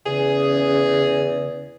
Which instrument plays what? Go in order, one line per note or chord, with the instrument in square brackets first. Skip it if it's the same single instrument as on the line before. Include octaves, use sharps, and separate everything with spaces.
[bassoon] E2 [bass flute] C#3 [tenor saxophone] G#4